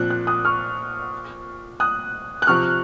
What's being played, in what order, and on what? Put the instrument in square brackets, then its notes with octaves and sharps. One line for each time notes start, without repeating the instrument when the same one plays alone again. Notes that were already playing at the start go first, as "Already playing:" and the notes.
Already playing: [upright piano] A#2 F3 C4 [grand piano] F#6
[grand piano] F#6
D#6 F#6
C#6 F6
D#6 F#6
F#6
[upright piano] C3 F3 C4 [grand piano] C#6 F6